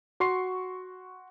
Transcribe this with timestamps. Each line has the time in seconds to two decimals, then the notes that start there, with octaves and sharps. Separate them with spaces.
0.20 F#4 C6 C#6 C7